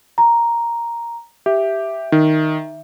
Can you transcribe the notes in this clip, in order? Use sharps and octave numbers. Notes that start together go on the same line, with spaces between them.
A#5
G4 E5
D#3